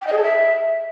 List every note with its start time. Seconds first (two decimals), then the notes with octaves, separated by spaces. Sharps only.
0.01 G5
0.07 D#5
0.12 G#4
0.17 A4
0.23 E5